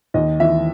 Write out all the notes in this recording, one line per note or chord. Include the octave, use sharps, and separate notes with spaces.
D#2 D#5
E3 E5